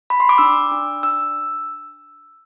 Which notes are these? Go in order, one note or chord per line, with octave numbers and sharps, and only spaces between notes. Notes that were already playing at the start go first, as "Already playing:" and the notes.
B5
C6
D6
D4 E6
D4
D4 E6